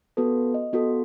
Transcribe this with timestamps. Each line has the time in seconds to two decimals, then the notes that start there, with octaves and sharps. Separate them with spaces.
0.17 B3 F#4 A4 B4
0.54 D#5
0.73 B3 F#4 A4